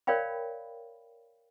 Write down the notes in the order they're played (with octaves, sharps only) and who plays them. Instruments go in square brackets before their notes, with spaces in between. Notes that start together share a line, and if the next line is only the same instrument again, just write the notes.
[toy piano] A#4 C#5 D5 F5 G5 B5